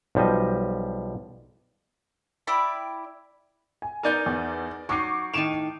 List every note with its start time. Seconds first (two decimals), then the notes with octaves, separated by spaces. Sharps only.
0.15 B1 F3 G3 C5 D#5
2.47 E4 D5 G5 B5
3.82 G#5
4.03 B3 D#4 A#4 D5 A#5 G6
4.26 E2
4.89 F#3 D#4 C#6 D6 C7
5.33 A2 D#3 D#4 D7 E7 F7